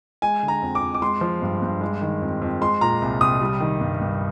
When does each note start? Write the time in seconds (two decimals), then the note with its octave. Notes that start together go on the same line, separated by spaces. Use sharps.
0.22 G#3 G#5
0.43 D3
0.48 A#5
0.62 F2
0.75 D6
0.82 F2
0.94 D6
1.02 G#3 C6
1.21 F3
1.42 G2
1.62 G2
1.81 G#3
2.01 D#3
2.22 F2
2.42 F2
2.61 G#3 C6
2.81 A#2 A#5
3.02 C2
3.21 C2 D#6
3.41 G3
3.60 D#3
3.81 G2
4.01 G2